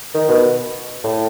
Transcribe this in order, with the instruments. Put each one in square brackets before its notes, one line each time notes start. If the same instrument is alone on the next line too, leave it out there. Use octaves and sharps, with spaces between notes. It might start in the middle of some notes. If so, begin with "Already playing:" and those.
[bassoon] D#3
B2
A2